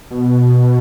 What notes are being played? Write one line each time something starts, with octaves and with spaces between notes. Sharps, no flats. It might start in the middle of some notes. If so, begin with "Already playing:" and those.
B2